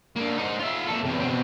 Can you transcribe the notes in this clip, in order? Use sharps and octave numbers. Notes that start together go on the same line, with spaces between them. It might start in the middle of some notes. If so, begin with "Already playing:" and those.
D3 A#3
D#4 C5
F4 E5
A#3 A4
E2 C3
B2 C4